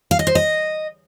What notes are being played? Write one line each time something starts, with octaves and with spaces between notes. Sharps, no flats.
F5
D#5
C5
D#5